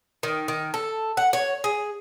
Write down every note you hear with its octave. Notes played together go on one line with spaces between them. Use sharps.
D#3
D#3
A4
F#5
C#5
G#4